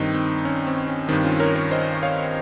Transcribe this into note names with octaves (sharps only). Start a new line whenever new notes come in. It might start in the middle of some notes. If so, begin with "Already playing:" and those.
Already playing: G2 D#3 C4 D#4
C4
C#4
C4
C#4
G2 D#3 C4 D#4
C#4 F4
A#4 C#5
A#4 C#5
C5 D#5
C#5 F5